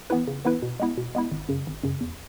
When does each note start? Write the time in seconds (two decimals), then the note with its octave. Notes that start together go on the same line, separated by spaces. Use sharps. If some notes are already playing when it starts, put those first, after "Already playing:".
0.10 E3 B3 E4 B4
0.28 C#3
0.45 E3 B3 E4 B4
0.62 B2
0.80 G#3 B3 E4
0.98 B2
1.15 G#3 B3 E4
1.32 G#1
1.49 F#2 C#3
1.67 G#1
1.83 F#2 C#3
2.01 E2